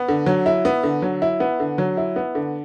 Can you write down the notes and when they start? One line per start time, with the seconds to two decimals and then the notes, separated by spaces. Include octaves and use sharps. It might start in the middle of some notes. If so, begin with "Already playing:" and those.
Already playing: B3
0.08 D3
0.26 F#3
0.46 E4
0.65 B3
0.83 D3
1.02 F#3
1.22 E4
1.40 B3
1.60 D3
1.78 F#3
1.97 E4
2.16 B3
2.35 D3